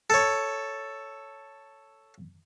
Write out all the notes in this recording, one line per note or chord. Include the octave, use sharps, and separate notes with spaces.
A4 C#5